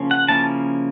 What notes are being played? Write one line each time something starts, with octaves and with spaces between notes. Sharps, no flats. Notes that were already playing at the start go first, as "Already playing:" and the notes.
Already playing: C#3 F3 A#3 C#4
F#5
C#3 F3 A#3 C#4 E4 A5